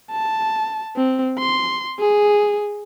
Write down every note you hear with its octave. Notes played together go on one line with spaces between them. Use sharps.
A5
C4
C6
G#4